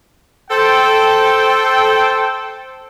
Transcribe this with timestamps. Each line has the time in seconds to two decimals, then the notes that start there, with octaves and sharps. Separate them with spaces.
0.50 A4 C5 G5